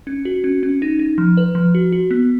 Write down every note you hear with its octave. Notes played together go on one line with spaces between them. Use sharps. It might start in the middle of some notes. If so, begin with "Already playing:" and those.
C#4
F#4
C#4
C#4
D#4
D#4
F3
B4
F3
F#4
F#4
B3